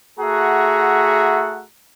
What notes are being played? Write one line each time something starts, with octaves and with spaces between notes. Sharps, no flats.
A3 F#4 G#4 E5 F#5 A#5